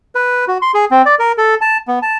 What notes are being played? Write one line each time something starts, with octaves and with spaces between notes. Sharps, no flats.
B4
F#4
C6
G#4
C4
D5
A#4
A4
A5
B3
A5